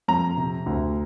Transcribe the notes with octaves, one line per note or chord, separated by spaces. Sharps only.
F2 A#5
C3
D2